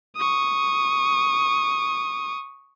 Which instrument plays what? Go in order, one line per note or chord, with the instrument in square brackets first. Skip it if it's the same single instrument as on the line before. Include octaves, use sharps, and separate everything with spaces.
[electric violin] C#6 D#6